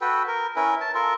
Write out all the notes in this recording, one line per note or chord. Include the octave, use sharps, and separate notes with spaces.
F#4 A4 B4 G5
A#4
C#4 E4 A#4 B4
A5
F4 A4 A#4